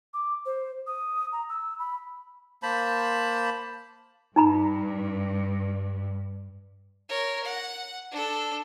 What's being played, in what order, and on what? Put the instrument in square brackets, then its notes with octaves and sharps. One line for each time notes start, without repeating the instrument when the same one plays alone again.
[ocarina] D6
C5
D#6
A#5
E6
B5
[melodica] A#3 C5 A5 B5
[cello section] G2 [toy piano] D#4 A#5 B5
[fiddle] A#4 C#5
F#5
D4 A4